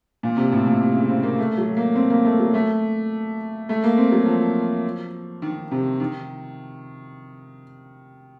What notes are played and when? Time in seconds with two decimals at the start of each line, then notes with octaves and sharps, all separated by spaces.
0.23 A#2
0.37 C3
0.52 A2
0.67 A#2
0.80 C3
0.94 C#3
1.09 C4
1.23 A#3
1.39 A3
1.58 F#3
1.77 A#3
1.95 C4
2.10 A#3
2.25 A3
2.40 F#3
2.54 A3
3.69 A3
3.84 A#3
3.98 C4
4.12 F#3
4.26 F3
5.42 D#3
5.71 C3
6.00 D#3